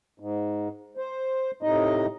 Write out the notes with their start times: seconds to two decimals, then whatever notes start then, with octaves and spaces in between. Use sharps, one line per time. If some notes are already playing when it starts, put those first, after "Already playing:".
0.20 G#2
0.97 C5
1.63 A2 C3 D#4 D#5